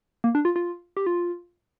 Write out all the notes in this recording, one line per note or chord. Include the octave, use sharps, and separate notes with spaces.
A#3
D4
F4
F4
G4
F4